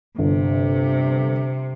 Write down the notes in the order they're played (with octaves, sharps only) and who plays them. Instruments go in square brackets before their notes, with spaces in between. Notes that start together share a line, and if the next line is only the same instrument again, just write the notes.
[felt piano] G1 [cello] C3